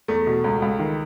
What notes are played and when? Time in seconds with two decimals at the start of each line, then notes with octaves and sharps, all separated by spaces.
0.08 E2 A3
0.27 B2
0.44 C#2
0.62 C#2
0.79 D#3